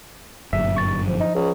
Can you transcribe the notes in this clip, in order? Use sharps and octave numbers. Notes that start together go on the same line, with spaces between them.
G1 F#2 A#2 E5
C#6 A6
F3 C5
D#4
C#2